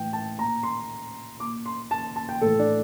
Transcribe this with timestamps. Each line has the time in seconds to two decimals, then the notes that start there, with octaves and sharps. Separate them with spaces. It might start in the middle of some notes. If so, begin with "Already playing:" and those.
Already playing: A2 E3 G5
0.13 A5
0.38 A#2 A#5
0.63 C6
1.40 A#2 D6
1.66 C6
1.91 A5
2.16 A5
2.29 G5
2.42 A2 E3 A4
2.59 D4